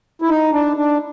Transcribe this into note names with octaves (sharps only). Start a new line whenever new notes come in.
E4
D#4
D4
D4